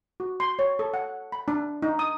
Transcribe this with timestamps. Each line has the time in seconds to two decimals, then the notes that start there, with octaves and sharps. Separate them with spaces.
0.20 F#4
0.40 C6
0.59 C#5
0.79 A4
0.94 F#5
1.32 B5
1.48 D4
1.82 D#4
1.99 D#6